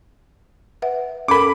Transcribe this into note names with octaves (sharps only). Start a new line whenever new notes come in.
B4 E5 F#5
C#4 A4 A#4 B5 D6